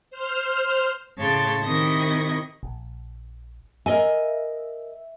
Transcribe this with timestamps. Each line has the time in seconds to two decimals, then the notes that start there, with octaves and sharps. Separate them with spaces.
0.10 C5 F6
1.17 A2 C#3 C#5 A5 C6 A6
1.63 C3 D#3 E4 D#5 C#6 A#6
2.63 A#1
3.86 A#4 D#5 E5 G#5